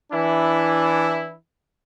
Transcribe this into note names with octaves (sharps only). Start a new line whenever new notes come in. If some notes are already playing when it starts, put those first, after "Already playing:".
E3 D4 E4